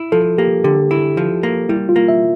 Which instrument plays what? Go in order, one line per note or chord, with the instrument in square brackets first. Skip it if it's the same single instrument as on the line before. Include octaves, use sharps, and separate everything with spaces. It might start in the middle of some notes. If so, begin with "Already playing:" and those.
Already playing: [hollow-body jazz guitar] E4
[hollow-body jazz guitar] F3 [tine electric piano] A4
[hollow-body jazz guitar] A#3 [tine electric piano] G4
[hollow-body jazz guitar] D3 [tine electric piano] G4
[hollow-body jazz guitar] E4
F3
A#3
[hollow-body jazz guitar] G3 [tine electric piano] E4
[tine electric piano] F4
[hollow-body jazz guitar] A#3
[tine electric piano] E5